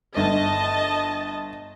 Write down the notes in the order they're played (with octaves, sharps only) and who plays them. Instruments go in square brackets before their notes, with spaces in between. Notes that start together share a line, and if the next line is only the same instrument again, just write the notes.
[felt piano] G1 [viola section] D#5 A5